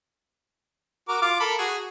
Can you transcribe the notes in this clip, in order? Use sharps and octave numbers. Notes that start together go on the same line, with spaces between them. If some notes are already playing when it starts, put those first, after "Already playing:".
F#4 A#4 D6
F4 F5 D6
A4 A#4 B5
F#4 G#4